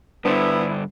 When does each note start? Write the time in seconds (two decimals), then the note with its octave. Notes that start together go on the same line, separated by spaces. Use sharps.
0.25 G2 D3 B3 D4 E4 C5 D5